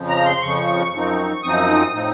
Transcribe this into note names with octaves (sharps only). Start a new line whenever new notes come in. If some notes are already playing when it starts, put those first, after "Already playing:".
Already playing: F2 C#3 F3
A#5
C6
F2 C#3 F3 C#6
F#2 F3 C4 D#4
F#2 F3 C4 D#4 D#6
A2 F3 C4 D#4